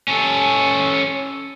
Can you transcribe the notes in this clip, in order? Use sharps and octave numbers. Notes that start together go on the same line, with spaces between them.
C#4 A4